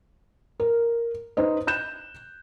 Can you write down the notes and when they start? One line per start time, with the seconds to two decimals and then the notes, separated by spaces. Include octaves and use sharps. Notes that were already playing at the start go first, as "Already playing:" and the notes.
0.60 A#4
1.37 D#4 B4 C5 D#5
1.67 F#6 G6 E7